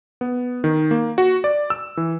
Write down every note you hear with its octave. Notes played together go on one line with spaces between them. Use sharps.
B3
D#3
A#3
F#4
D5
E6
E3